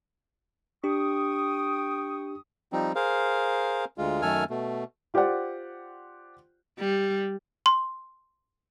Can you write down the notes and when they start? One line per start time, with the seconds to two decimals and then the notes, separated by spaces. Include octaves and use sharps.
0.84 D4 G4 G5 C#6 D#6
2.73 F3 G3 C4 D#4
2.95 G#4 A#4 C5 F5
3.98 D2 G#3 F4
4.22 F#2 D#3 A3 A4 G#5 F6
4.50 B2 A3
5.14 F4 G4 C5 D5 F#5
6.79 G3
7.66 C6